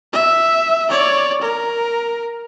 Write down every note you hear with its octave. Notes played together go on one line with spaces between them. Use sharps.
E5
C#5 D5
A#4